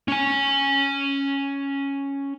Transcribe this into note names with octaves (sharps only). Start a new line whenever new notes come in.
C#4 G#5